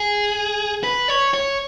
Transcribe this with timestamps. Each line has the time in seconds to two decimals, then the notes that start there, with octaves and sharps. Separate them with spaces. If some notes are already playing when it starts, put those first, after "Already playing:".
Already playing: G#4
0.84 B4
1.08 C#5
1.34 C#5